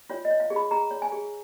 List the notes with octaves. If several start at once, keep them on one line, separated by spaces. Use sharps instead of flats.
F4 C#5
D#5
C#5
F5
G#4
B5
G#4 A#5
C#5
G#5
G#4